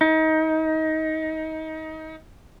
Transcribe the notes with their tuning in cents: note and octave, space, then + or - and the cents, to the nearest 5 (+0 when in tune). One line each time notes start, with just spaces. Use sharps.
D#4 +25